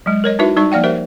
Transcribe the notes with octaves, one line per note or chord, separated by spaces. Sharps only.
F#3 G#3
A#4 C#5 D#5
D#4 E4 F#4 B4 E5
G3 D#4 E5 C#6
F3 A#3 D5 F#5 G5
G4 A#4 C5 E5